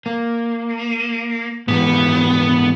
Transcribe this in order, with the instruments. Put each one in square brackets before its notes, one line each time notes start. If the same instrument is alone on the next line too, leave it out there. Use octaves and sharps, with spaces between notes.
[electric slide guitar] A#3
[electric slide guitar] G#2 E3 G3 [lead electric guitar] B3